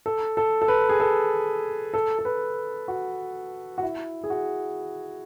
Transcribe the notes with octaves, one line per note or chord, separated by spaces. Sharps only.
A4
A4
A4
B4
G#4
A4
A4
A4
B4
F#4
F#4
E4
G#4
F#4